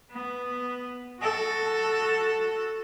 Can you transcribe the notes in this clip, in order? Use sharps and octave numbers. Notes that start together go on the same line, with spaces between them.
B3
F#4 A4